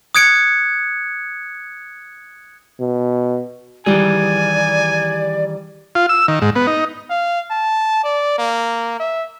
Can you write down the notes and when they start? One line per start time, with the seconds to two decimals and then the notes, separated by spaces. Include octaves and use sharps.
0.15 D#6 F#6 G#6 C#7 D7
2.80 B2
3.86 D#3 E3 G3 G#4 D5 G#5
5.95 F4
6.09 E6
6.28 D#3
6.42 G#2
6.56 B3
6.67 D#4
7.10 F5
7.51 A5
8.04 D5
8.38 A#3
8.99 E5